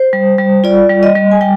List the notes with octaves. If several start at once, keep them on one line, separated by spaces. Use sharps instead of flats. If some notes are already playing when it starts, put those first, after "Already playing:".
Already playing: C5
G3
G3
F4 D5
G3
D#5
G3
G#5
G3 G5